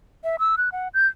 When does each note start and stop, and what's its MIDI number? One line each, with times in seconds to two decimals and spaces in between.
0.24 0.36 76
0.39 0.56 88
0.58 0.69 90
0.72 0.88 78
0.94 1.07 91